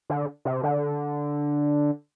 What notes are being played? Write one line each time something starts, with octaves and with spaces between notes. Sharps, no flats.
D3
C3
D3